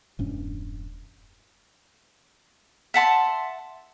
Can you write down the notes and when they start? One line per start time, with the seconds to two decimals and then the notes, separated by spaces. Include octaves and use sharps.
0.19 E1 G2 C#4
2.94 E5 F#5 A5 C6